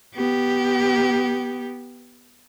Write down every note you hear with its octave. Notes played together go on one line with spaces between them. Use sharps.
B3 G4